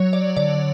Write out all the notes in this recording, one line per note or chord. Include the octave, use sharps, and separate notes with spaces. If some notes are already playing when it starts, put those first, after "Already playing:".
Already playing: F#3 C#5
D5
D3 D5